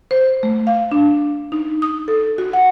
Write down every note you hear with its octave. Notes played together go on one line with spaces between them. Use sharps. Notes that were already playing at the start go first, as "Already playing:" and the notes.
C5
A3
F5
D4
D#4
D#6
A4
F#4
F#5